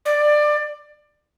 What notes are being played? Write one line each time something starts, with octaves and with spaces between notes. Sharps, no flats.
D5